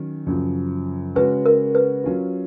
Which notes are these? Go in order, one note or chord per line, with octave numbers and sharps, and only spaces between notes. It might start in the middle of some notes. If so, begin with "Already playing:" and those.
Already playing: D#3 F#3 C#4
F#2 C#3 F3
C#3 G#3 C#4 F#4 B4
A#4
B4
F#3 C#4 F4